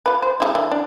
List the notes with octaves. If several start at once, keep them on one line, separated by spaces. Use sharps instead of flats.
F4 B4
C5
G#3 D#4 E4
E3 D4
D4